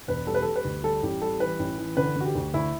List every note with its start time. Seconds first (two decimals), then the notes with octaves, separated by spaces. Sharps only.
0.08 E1 B4
0.27 G3 A4
0.35 B4
0.42 G3 A4
0.56 B4
0.65 D2
0.83 G3 A4
1.03 A1 G4
1.22 G3 A4
1.40 E3 B4
1.59 A1
1.78 E3
1.97 D3 B4
2.16 D3 F#4
2.25 G4
2.35 D2
2.54 D2 E4